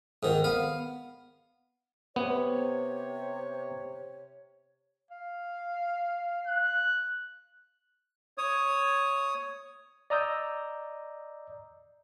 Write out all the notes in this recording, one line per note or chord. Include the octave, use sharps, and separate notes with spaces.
G#2 D#3
B3 F5
C3 B3 C#5
F5
F#6
C#5 D#6
D5 D#5 A#5 D#6 E6 G6